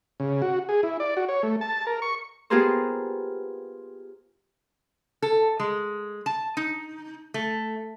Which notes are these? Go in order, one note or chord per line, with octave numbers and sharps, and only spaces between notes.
C#3
F#4
G#4
E4
D5
F#4
C#5
A3
A5
A#4
C#6
B3 F4 G4 G#4 A#4 C5
A4
G#3
A5
D#4
A3